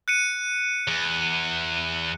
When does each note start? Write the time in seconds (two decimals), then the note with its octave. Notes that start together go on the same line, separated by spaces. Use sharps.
0.08 F#6 C#7 D#7
0.88 E2